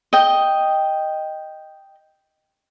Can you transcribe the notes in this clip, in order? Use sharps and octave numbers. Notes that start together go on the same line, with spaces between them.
D#5 G5